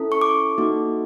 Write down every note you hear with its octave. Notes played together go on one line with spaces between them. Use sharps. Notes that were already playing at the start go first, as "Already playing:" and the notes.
Already playing: C#4 E4 A4
C#6
D6
A#3 D#4 F#4 A4